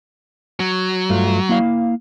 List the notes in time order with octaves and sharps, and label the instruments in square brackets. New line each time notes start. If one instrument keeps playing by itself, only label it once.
[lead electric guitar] F#3
[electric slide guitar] G2 A3 F4
A#3 E4 F5